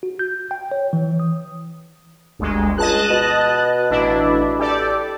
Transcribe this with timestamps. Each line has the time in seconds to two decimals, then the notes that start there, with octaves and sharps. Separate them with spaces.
0.03 F#4
0.19 G6
0.51 G5
0.72 C#5
0.93 E3
1.20 D#6
2.39 G1 D2 G#3
2.78 C#2 D#5 A5 F#6
3.10 B2
3.91 A1 D4 E4
4.59 G4 A4 D5